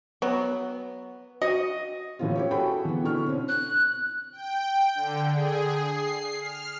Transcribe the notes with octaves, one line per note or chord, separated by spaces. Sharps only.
F#3 B3
F#4 D#5
A2 E3 A#3 C#4 E4 F4
E4 G4 C#5
F#4 G#4 A4 G5 B5
E3 B3
B2 D3 E4 C#6 F6
C4 C#4
F#6
G5
D3
G#4
C7
F6